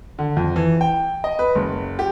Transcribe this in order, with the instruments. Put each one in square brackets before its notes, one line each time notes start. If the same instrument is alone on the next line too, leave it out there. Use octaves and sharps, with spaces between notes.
[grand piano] D3
F2
E3
G5
D#5
B4
F#1
G4